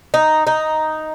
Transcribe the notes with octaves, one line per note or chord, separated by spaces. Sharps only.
D#4
D#4